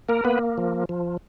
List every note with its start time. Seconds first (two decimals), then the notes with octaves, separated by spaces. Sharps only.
0.09 A#3 A#4
0.25 A#3 B3 B4
0.58 F3
0.89 F3